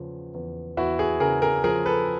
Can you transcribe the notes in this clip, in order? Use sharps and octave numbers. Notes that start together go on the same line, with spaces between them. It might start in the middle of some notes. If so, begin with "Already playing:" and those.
Already playing: E2 C#3 F3
E2
E2 E4 F#4
F#4 G#4
C#3 G#4 A#4
G#4 A#4
F3 G#4 A#4
A4 B4